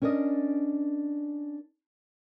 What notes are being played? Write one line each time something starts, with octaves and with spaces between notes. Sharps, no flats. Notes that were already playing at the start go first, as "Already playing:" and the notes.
C#4 D4 A#4 D5 D#5